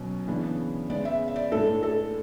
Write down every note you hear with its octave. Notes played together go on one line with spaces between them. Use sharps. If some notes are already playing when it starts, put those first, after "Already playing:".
Already playing: B2 F#3 C#4
C#3 E3 B3 D4
C#3 G#3 B3 D5
E5
E5
D5
A2 G#3 D4 A4
A4